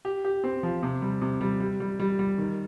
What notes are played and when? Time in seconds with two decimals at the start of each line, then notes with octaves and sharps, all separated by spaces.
0.05 G4
0.24 G4
0.44 C4
0.63 F3
0.83 C3
1.02 G3
1.21 C3
1.41 G3
1.60 G3
1.80 G3
1.99 G3
2.19 G3
2.38 D#3